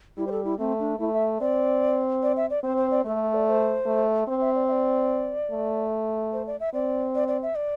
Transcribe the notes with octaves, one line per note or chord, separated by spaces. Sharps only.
G3 E4
C5
A4
E4
A3 C4
D4
A3 E4
E5
C4 D5
D5
E5
D5
C4 C5
C5
D5
A3 A4
D5
D5
C5
A3
C4 C5
E5
D5
E5
D5
A3
C5
D5
E5
C4 D5
D5
D5
E5
D5